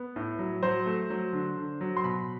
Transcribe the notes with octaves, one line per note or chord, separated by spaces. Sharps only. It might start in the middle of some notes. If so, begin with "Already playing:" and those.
Already playing: B3
A2
F#3
F#3 C5
A3
F#3
D3
D3
F#3
C6
B2 B5